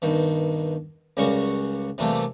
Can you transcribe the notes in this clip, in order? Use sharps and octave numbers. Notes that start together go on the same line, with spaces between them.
G2 B2 D#3
C#2 C#3 G3 F#4 A#4 C#6
C3 E3 G3 A3 A#3